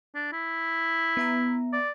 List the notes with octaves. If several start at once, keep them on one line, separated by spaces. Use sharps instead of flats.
D4
E4
B3 E5 A#5
D5